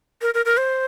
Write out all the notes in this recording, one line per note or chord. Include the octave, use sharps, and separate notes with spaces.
A#4
A#4
A#4
C5